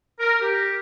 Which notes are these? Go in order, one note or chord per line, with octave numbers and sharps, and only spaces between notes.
A#4
G4